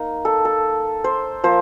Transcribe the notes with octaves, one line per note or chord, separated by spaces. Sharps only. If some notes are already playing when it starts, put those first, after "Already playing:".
Already playing: A#3 D#4
A4
A4
C5
F3 A#3 C5